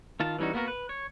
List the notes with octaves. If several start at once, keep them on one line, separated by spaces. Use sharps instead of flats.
D#3 F4 A5
E3 G3 C#4 D#4 F#4
A#3 B3 F#4 A#4
B4
C#5